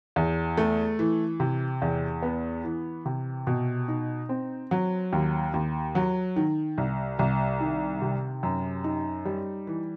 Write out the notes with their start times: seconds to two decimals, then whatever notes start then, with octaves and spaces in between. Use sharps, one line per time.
0.16 E2
0.57 A3
0.99 E3
1.40 C3
1.82 E2
2.22 B3
2.64 E3
3.06 C3
3.47 B2
3.88 D#4
4.29 C4
4.71 F#3
5.12 D#2
5.54 D#2
5.95 F#3
6.36 D#3
6.78 C2
7.19 C2
7.60 D#3
8.02 C3
8.43 F#2
8.84 D#4
9.25 G3
9.67 E3